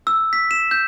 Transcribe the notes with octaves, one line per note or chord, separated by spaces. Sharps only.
E6
B6
E7
G6